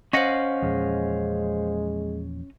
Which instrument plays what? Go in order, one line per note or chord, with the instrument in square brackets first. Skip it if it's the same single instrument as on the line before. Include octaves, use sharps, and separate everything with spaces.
[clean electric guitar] C#4 D#5 F#5 [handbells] C5 F5
[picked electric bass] E2 A#2 F3 [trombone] G#3